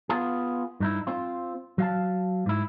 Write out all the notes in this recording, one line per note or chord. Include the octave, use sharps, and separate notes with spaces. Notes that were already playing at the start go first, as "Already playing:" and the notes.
B3 F4 G#4
G2 D#4 E4
C4 F4
F#3 F5 A5
G#2 E4